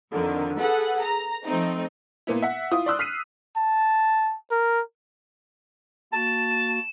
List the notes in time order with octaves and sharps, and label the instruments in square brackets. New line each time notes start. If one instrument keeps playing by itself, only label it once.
[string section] F2 D3 D#3
G#4 A4 B4 F#5
A#5
F3 A3 C4 D#4
[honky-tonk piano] A#2 A#3 B3 E4
E5 F#5
E4 F4 D#6
D5 C6 E6 F#6
F6 B6 C7 D#7
[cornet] A5
A#4
[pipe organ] A#3 F#4 [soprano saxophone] A5 [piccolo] E7